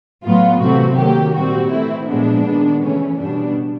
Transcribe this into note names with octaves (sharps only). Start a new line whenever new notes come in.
A2 F#3 B3 F4
C3 E3 A3 C4 F#4
D#3 F#3 A#3 G4
A#2 G3 C4 F#4
E3 A3 C4 E4
A#2 F3 G#3 B3 D4
D#3 G#3 B3
C#3 E3 A3 C#4
B2 G3 B3 D4